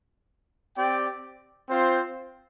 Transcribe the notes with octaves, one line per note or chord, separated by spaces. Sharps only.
C4 G4 D5 G5
C4 F4 C5